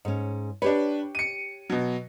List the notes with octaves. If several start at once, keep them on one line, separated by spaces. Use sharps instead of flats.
G#2 C#4
D4 G4 B4 C#5
C#7 D#7
B2 F#3